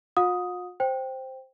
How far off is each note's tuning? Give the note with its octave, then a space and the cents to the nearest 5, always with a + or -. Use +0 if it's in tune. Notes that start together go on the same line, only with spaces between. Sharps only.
F4 +45 F#5 -45 D#6 +5
C5 +0 G5 +0